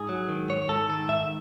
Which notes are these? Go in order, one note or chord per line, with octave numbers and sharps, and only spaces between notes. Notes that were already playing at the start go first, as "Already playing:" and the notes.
Already playing: G#2 G#4
F#3
D#3
G#2 C#5
G#2 A4
D#3 A4
G#2 E5